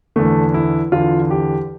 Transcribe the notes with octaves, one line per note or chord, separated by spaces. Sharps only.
E2 D3 A3
E4
E2 D3 F4
G4